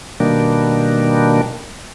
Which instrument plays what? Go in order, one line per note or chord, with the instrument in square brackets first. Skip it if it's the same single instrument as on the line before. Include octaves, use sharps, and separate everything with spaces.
[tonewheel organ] B2 D#3 G3 A#3 D4